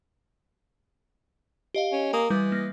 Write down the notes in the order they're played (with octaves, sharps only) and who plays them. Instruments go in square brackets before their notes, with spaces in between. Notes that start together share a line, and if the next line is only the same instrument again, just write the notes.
[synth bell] G4 D#5 F5
[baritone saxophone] C#4
[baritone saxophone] A#3 [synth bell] G#5 D#6
[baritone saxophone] E3 [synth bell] G3
[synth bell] A#3 A#6